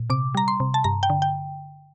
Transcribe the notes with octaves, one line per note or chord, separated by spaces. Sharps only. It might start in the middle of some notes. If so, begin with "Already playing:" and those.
Already playing: A#2
C3 D6
G3 A#5
C6
C3
A5
G2 A#5
G5
D3
G5